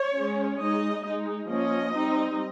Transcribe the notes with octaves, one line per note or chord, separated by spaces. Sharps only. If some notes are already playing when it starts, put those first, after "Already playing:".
Already playing: C#5
G#3 C#4
G#3 D#4 D#5
G#3 D#4
F3 A#3 C#4 D#5
G3 C4 D#4